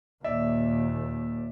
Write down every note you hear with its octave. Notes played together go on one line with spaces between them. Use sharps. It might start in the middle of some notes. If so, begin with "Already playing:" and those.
D#2 A#2 D5 E5